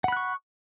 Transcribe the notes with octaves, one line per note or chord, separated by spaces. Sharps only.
F#5 B5 C#6 F#6